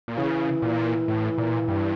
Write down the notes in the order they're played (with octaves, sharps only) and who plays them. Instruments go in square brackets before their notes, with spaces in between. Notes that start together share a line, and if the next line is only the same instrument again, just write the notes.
[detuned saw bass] A#2
[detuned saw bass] C#3 [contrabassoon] E3
[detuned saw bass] A#2
A2
A#2
G2